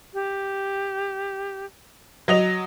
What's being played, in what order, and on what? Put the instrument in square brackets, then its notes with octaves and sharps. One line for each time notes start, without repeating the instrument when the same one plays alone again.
[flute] G4
[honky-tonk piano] F#3 D#5 F7